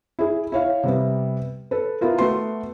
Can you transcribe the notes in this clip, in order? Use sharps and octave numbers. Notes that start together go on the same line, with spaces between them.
E4 G#4
E4 C#5 F5
C3 G3 B3
A4 B4
B3 E4 F4 A#4
A3 B3 F#4 C6